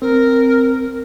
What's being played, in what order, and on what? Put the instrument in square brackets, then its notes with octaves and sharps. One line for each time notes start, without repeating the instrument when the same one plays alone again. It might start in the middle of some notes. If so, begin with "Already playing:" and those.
[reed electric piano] C4 [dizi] A#4